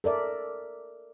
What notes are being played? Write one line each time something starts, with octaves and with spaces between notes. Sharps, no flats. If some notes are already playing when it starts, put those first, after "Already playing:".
A4 A#4 D5 E5